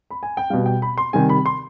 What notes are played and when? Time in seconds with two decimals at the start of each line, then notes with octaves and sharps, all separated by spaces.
0.11 B5
0.23 G#5
0.37 G5
0.50 B2 G3 F5
0.66 G5
0.82 B5
0.98 C6
1.13 C3 D#3 G3 G#5
1.29 B5
1.46 C6